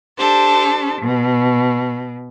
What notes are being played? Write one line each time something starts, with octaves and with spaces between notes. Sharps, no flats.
D4 G4 A4 C5
B2